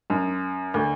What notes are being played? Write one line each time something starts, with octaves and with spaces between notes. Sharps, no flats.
F#2
D2